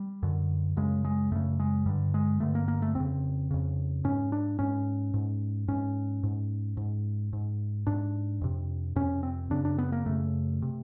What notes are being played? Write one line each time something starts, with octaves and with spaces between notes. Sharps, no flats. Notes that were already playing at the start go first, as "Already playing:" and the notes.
Already playing: G3
F#2 D3
F#2 C#3 G#3
G#3
F#2 C#3 A3
G#3
G2 D3 G3
G#3
G2 D3 A3
A#3
A#3
A3
F2 C#3 C4
F2 C#3
G#2 C#4
D4
G#2 C#4
G#2
G#2 C#4
G#2
G#2
G#2
G#2 D4
F2 C3
F2 C3 C#4
C4
F#2 C#3 D4
D4
B3
A#3
F#2 C#3 A3
C3